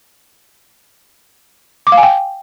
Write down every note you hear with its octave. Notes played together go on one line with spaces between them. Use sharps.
D6
F5
G#5
G5